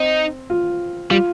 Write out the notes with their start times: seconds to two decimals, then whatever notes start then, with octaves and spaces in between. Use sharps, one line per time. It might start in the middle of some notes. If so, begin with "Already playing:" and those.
Already playing: C4 D#4
0.50 F4
1.11 G3 F4